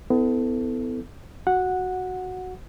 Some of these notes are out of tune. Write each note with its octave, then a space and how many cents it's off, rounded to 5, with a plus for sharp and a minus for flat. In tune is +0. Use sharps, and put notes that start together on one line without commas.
B3 +35 E4 -20 A4 +0
F#4 +0 F#5 -10